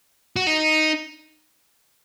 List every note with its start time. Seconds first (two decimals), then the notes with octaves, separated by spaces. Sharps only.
0.36 F#4
0.47 D#4